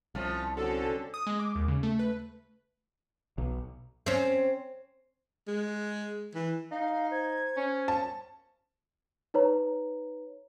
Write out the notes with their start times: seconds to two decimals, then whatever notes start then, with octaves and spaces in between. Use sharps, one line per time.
0.15 C2 F3 A3 C#4
0.57 D3 C4 C#4 F#4 A4
1.14 D#6
1.27 G#3
1.39 D6
1.55 D#2
1.68 C#3
1.83 A3
1.99 B4
3.38 B1
4.06 C4 C#4
5.47 G#3
6.35 E3
6.71 D#4 F5
7.12 C5 G#6
7.57 C#4
7.88 A5
9.34 D#4 B4 C#5 A#5